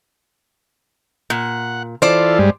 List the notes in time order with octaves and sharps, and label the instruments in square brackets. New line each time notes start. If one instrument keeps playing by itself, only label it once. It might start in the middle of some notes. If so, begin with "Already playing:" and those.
[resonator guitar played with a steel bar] A#2 [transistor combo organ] F#5
[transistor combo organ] E3 F4 A4 [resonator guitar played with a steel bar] C5 D5
[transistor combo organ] G2 G3 G#3